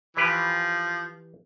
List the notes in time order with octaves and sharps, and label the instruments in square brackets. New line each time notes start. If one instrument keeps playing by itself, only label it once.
[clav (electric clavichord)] E3 G4 B4 [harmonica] F3